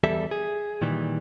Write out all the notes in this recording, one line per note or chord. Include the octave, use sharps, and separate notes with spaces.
E2 G3 A4 E5
G#4
A#2 D#3 E3 G3